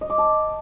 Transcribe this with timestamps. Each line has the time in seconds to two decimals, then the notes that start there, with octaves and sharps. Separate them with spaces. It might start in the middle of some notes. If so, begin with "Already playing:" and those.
0.01 D#5
0.10 D6
0.18 A5